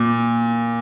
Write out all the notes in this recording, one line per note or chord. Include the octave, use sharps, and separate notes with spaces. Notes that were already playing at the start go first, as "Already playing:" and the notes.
Already playing: A#2